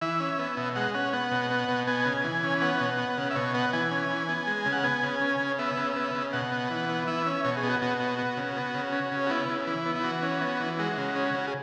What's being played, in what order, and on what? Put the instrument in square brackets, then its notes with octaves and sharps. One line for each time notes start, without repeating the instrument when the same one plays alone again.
[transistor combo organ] E3 E5
C#4
B3
B2
G#3 F#5
C#4 F#5
B3 F#5
B2
B3
B2
B3 G#5
C#3
E3
C#4
B3 F#5
B2
B3
C#3
E5
B2 C#5
B3 F#5
E3 G#5
C#4
E3
B3
G#3
C#3
F#5
B3 G#5
C#3
C#4
C#3
B3 E5
C#3
B3
C#3
B2 F#5
B3
E3
B3
E3 E5
C#4
B2 C#5
G#4
B3
F#4
B2 F#4
B3
B3
C#3
B3
C#3
C#4
C#3
F#4
B3 E4
C#3
E3
B3
E4
E3 F#4
C#4
B3
E3
G#3 F#4
C#3
C#4
C#3
G#4